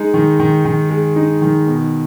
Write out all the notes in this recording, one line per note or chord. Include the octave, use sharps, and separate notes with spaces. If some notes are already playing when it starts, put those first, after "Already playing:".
Already playing: G#3 D#4
D#3
D#3
D#3
G#3
D#4
D#3
B2